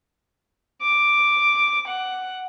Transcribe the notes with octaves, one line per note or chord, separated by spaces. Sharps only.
D6
F#5